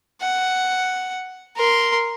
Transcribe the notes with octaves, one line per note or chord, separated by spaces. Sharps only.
F#5
A#4 C6